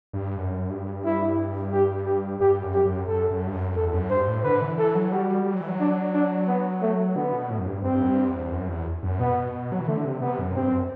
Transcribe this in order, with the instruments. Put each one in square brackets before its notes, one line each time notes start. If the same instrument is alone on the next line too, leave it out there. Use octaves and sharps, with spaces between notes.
[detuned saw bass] G2
F#2
G2
[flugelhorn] E4
G4
G4
[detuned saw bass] G2 [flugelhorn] G4
[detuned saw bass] F#2
[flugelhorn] G4
[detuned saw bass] F#2
[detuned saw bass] F#2 [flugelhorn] A4
[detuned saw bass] F#2
G2
F#2
[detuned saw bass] E2 [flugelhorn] A4
[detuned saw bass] F#2
[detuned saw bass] G2 [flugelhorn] C5
[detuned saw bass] A2
[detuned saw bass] D3 [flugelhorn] B4
[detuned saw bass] E3
[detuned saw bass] E3 [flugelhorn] A4
[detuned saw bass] F#3
[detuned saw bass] G3 [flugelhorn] F#4
[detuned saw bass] G3
F#3
E3
F#3
[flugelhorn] D4
D4
B3
A3
[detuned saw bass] D3 [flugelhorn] B3
[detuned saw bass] B2
A2
F#2
G2
[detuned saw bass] G2 [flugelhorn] C4
[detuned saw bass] F#2
G2
E2
F#2
E2
F#2
[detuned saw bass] B2 [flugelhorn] B3
[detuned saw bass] F#3
E3
[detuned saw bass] D3 [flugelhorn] A3
[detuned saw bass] C3
[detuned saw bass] C3 [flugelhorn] B3
[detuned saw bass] F#2
[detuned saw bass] G2 [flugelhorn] C4
[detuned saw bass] F#2